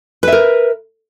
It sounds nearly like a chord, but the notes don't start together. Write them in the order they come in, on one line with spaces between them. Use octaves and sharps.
B4 E5 A#4